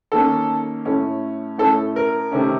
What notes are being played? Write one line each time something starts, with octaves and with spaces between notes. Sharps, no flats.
D#3 A#3 C#4 A4
A2 A3 C#4
A2 A3 C#4 A4
A#4
C3 D#3 A3 C#4